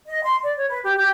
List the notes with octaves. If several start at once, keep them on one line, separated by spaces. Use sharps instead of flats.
D#5
C6
D5
C#5
B4
G4
G4